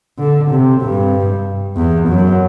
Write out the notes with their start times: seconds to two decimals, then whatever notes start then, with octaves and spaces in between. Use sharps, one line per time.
0.19 D3
0.51 C3
0.82 G2
1.76 E2
2.08 F#2